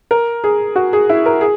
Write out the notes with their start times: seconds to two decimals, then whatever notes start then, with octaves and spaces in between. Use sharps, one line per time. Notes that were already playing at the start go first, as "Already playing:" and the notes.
0.11 A#4
0.44 G#4
0.76 F#4
0.93 G#4
1.09 E4
1.26 A#4
1.41 G#4